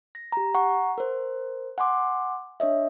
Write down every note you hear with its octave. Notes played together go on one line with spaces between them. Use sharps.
A#6
G4 A#5
F#5 A#5 C#6
A#4 C5
F#5 G#5 C6 D6
D4 C#5 D#5 E5